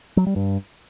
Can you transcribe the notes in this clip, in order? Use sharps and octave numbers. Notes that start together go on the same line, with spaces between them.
F#3
G3
G2